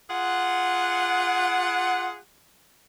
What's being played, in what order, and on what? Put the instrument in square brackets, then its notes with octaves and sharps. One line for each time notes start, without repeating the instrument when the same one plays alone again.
[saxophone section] F4 G#4 F#5